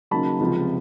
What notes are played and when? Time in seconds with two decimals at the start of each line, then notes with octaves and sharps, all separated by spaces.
0.11 C#3 F#3 A#3 D#4 A5 B5
0.40 C#2 C3 F3